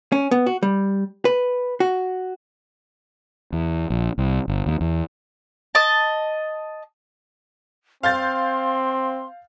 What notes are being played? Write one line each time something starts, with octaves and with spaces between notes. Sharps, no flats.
C#4
B3
F#4
G3
B4
F#4
E2
A#1
C2
G1
D#2
E2
D#5 A5
C4 F5 C6 G6 A6